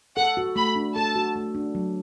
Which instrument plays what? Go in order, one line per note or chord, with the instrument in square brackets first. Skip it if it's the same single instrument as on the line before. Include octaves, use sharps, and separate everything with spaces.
[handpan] A4 [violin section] F#5
[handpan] F#4
[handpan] A3 [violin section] B5
[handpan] D4
[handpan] A4 [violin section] A5
[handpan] F#4
A3
D4
F#3